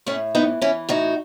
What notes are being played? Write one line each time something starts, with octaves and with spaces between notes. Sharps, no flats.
A2 A3 C#4
E3 B3 D#4
E3 C#4 E4
A2 D#4 F#4